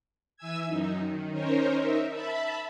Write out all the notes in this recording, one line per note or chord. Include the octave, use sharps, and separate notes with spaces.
E3 E5 G#5 E6 G#6
F#2 D#4
D#3
C#4 D#4 A#4 C5 C#5
D#4 A#4 E5
E5 A5 B5